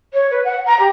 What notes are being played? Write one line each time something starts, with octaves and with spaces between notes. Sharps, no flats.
C#5
B4
F#5
A#5
G4